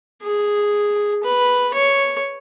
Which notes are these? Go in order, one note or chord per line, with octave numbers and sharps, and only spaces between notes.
G#4
B4
C#5